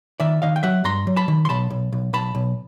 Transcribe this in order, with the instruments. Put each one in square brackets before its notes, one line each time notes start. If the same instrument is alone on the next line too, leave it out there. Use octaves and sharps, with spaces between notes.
[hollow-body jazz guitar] D#3 D5 E5
D#3 D#5 F5
G5
F#3 E5 F#5
G2 A#5 C6
F#3
A5 B5
D#3
C6
B1 A5 B5
B1
B1
B1 A5 B5
B1